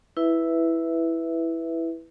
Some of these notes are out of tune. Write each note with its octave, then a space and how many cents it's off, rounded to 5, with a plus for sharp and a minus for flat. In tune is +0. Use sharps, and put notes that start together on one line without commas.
E4 +0 B4 +0 E5 +0